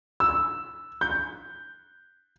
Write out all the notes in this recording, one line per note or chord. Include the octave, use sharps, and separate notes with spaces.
E6
G6